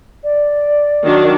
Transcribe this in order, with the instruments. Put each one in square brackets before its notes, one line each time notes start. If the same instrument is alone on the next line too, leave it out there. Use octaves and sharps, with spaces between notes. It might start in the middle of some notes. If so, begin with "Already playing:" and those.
[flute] D5
[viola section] D#3 F#3 D4